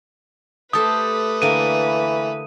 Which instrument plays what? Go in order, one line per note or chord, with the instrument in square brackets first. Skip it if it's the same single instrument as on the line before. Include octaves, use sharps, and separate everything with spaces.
[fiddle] A3 B4 [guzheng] G4 A4 C5 [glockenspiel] D#6
[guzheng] D3 A#3 [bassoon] E3 [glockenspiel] D#7